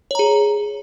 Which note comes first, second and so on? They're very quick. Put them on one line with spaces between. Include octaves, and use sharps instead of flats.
C#5 A#5 G#4